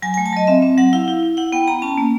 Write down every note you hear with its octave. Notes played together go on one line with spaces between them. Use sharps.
F#3 G#5
G#5
A3
A5
F#3 D#5
C4 E5
C4
F#3 F#5
E4 F5
E4
E4
E4 F#5
B3 G5
B3 A#5
C#4 A5
A#3